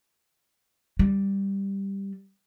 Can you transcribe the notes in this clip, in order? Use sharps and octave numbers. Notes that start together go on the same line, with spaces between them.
G3